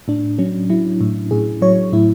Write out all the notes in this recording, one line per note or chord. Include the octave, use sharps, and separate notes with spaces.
A2 D4
F#3 C#4
F#3 E4
A2
A2 G#4
F#3 C#5
A2 E4